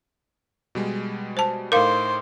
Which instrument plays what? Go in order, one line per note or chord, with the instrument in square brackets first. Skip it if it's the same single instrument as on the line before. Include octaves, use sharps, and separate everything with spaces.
[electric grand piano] B2 G3 G#3
[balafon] C5 A5
[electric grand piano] A2 D#4 D6 [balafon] A#4 F5 [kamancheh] C5